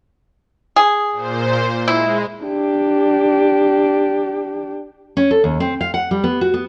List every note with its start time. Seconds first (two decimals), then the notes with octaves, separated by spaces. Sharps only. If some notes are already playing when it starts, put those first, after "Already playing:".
0.76 G#4
1.12 A#2 C5
1.88 G#3 E4
2.44 D4 G4
5.17 C#4
5.31 A4
5.44 D#2
5.60 C4
5.81 F5
5.94 F#5
6.11 G3
6.24 B3
6.41 F#4
6.54 B3